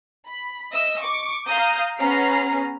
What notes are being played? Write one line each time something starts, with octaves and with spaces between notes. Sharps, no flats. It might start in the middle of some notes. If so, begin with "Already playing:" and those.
B5
D#5 E5 E6
C#6 D6
F5 A#5 D#6 G6
B3 C#4 G#4 A#5 F6 C7